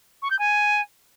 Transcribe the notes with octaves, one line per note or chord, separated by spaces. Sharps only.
C#6
G6
G#5